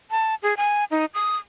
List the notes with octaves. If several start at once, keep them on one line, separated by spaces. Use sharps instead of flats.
A5
G#4
G#5
D#4
D#6